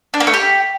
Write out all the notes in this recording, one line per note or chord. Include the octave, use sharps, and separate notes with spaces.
D4
A#3
A3
G4